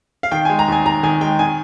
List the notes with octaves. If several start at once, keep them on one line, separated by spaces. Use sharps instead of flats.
F5
D#3 G5
G#3 G#5
A#5
D#2 G#5
D#2 A#5
D#3 G#5
G#3 G5
D#3 G#5